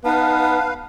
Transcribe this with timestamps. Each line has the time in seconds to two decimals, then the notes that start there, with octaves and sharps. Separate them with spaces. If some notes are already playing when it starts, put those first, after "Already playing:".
0.05 B3 D#4 B4 F5 A5